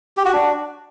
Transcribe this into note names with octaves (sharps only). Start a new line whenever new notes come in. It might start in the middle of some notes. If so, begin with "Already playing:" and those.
G4
F#4
D4